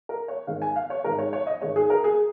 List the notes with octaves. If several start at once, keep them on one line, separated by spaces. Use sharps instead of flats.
A#4
C#5
G#2 D#3 G#3 F5
G#5
F5
C#5
G#2 D#3 G#3 A#4
C#5
C#5
D#5
G#2 D#3 G#3 C#5
G#4
A#4
G#4